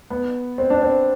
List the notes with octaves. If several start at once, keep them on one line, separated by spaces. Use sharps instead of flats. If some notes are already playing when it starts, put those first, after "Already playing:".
B3
C4
D4
C4